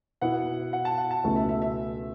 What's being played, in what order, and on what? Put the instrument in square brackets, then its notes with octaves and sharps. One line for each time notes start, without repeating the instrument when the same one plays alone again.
[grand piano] B2 B3 E4 [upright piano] F#5
[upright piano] F#5
A5
F#5
A5
[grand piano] C#2 B2 A3 E4
[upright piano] E5
E5
E5